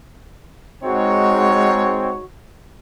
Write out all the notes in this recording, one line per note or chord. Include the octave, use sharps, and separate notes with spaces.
G#2 G#3 C4 D#4 F#4 C#5